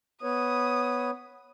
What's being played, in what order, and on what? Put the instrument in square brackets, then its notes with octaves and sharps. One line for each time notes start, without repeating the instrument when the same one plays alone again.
[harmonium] B3 B4 C#5 [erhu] D#6